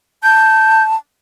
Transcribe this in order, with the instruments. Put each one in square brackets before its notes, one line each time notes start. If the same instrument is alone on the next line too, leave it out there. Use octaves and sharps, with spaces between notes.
[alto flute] A5 [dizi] G6